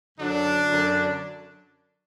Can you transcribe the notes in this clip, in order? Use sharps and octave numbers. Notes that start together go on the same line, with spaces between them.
F#2 D3 F#3 D4
F#2 D3 F#3